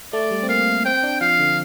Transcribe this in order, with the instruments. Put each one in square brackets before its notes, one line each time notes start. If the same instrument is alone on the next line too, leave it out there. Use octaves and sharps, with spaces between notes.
[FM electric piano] A3 [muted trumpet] D5
[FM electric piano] G3
C4
[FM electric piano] A#3 [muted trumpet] F5
[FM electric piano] C4 [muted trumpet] G5
[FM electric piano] D4
[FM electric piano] F3 [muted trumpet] F5
[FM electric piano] D3